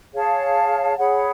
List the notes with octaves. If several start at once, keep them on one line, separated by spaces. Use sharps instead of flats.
G#4 C#5 F5 A5
G#4 C#5 F#5 B5